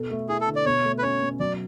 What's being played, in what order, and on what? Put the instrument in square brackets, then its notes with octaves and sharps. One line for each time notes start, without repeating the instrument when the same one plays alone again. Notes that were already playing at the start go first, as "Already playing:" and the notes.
Already playing: [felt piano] B2 A4
A3
[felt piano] E4 [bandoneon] G#4
[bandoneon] A4
[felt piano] D3
[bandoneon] D5
[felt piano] B2 [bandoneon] C#5
[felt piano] A3
[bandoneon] B4
[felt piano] C#4 [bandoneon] C#5
[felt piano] B2
[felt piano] F#3 [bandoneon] D5